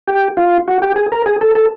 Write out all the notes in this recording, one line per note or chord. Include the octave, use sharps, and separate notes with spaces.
G4
F4
F#4
G4
G#4
A#4
G#4
A4
A4